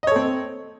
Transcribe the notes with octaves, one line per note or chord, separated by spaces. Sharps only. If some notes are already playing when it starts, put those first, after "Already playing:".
C4 A4 C#5 D#5